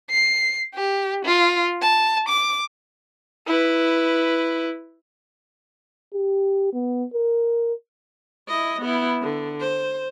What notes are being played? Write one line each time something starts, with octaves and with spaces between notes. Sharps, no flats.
C7
G4
F4
A5
D6
E4 B4
G4
B3
A#4
E4 D#5
B3 E4
D3
C5